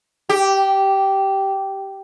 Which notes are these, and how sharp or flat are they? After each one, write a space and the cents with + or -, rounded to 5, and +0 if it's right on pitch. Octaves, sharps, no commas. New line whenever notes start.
G4 -10